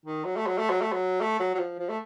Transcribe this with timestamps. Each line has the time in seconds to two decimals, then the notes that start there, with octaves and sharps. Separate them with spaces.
0.06 D#3
0.25 F#3
0.36 A3
0.47 F#3
0.58 A3
0.70 F#3
0.81 A3
0.93 F#3
1.21 A3
1.40 F#3
1.54 F#3
1.59 F3
1.79 F3
1.89 A3